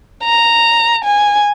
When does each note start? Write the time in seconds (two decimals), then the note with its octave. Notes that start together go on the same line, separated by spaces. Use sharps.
0.23 A#5
1.04 G#5